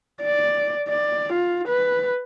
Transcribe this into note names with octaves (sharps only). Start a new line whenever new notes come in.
D5
D5
F4
B4